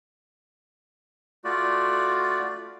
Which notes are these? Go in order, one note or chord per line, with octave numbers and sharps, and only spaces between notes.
A3 F4 F#4 D5